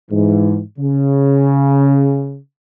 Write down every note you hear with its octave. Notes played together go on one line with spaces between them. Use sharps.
G#2 E3
C#3